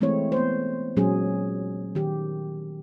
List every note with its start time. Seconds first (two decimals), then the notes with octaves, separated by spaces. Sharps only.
0.01 E3 G#3 A3 C4 E4 C#5
0.32 B3 C5
0.97 A#2 F#3 G#3 C#4 G#4
1.95 D#3 G4